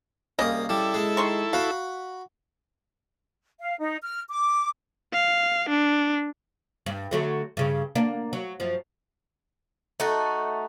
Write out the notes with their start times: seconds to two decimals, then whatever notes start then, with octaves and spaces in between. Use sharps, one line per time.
0.39 C2 C#3 A#3 D#5 D#6
0.69 G3 E4 A4
0.94 G#3
1.17 D#3 C6 C#6
1.53 F#4 F5 B5
3.60 F5
3.79 D#4
4.01 F6
4.29 D6
5.13 F5
5.69 D4
6.86 G2
7.11 D3 F#3 A3
7.57 G2 C#3
7.95 A#3 D4
8.33 F#3
8.60 F#2 F3
10.00 A3 D#4 F#4